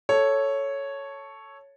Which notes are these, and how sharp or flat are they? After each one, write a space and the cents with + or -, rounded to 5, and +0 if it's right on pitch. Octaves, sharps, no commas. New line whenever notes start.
A4 +0 C#5 +0